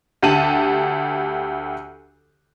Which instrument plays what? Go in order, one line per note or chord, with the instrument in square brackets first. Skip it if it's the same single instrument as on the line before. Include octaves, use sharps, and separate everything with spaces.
[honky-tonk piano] D2 G4 A5 D#7 F#7